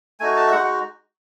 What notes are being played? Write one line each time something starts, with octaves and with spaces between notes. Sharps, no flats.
A3 D#4 F#4 G#5
A5
E5
G#3 D#4 F#4 F#5